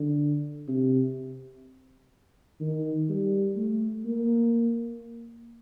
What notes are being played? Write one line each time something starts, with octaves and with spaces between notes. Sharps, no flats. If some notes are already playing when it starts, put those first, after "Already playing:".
Already playing: D3
C3
D#3
G3
A3
A#3